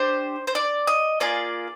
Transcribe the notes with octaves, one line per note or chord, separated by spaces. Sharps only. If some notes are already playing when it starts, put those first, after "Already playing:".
Already playing: D4 G4 C5
C5
D5
D#5
A#3 F4 G#4 D5